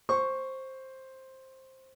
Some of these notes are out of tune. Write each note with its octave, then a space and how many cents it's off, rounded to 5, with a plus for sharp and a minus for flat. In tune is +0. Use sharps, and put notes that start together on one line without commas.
C5 +10 C#6 +0